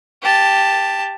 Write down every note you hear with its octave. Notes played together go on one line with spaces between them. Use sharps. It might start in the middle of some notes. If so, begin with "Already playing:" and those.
G4 A5